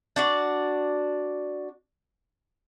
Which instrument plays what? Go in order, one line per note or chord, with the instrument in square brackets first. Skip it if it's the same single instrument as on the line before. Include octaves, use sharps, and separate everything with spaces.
[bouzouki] D4 F#4 D5